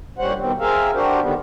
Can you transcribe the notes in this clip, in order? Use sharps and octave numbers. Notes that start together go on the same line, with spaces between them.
G2 A#2 G3 C#4 C5 F#5
B2 D#3 G3 C4
C4 G#4 A#4 E5 F5
D4 F#4 G4 A#4 C5
D3 D#3 G3 B3